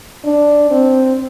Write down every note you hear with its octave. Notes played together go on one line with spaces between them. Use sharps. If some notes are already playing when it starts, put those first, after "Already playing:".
D4
C4